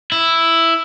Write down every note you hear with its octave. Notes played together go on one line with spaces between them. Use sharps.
E4